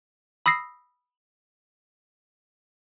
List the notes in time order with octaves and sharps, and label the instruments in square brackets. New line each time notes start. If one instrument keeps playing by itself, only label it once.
[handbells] B5 D#6 E6 A#6 C7